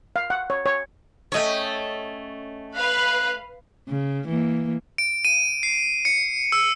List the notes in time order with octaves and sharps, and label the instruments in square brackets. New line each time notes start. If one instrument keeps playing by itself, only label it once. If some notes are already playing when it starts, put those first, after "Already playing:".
[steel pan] F5
F#5
C#5
C#5
[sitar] A3 C#5 [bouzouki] C#4 D#5 G5
[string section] B4 F5 B5 [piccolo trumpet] F#6
[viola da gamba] C#3
E3 A#3
[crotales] D7
D#7
C7
C#7
E6